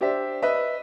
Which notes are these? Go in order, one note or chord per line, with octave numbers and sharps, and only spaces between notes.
D4 G4 C5 D5 E5
B4 D#5 E5